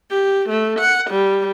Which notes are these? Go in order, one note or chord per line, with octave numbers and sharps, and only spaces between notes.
G4
A3
F#5
G3